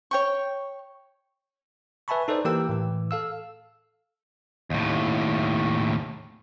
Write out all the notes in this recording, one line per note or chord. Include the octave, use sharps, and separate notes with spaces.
C#5 G5 C#6
B4 E5 G#5 A5 B5 C#6
D#4 A4 B4 C5 D5
E3 A#3 G4 A#4 G5 E6
A2 E3
A4 F5 E6
D#2 A2